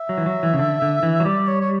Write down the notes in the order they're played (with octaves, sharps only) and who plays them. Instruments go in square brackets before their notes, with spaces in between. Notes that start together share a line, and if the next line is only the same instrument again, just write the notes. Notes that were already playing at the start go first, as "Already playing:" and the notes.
Already playing: [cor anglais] E5
[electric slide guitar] F#3
E3
F#3
E3
C#3
D3
D3
E3
F#3
[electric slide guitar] G3 [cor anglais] D5
[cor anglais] C#5
C#5